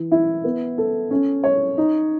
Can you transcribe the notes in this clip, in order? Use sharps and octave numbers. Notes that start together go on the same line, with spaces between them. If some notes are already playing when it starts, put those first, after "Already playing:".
Already playing: E3
E4
B3
A4
C#4
C#5
D#4